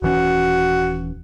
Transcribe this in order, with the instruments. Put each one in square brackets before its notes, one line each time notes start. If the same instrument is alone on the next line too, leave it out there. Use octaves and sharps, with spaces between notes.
[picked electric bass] D#1 E3 C#4 [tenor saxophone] F#4